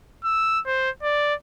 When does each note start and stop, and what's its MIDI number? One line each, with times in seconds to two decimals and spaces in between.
0.24 0.60 88
0.66 0.90 72
1.03 1.34 74